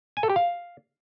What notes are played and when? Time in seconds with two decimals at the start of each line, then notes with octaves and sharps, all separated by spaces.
0.17 G#5
0.23 A4
0.30 G4
0.36 F5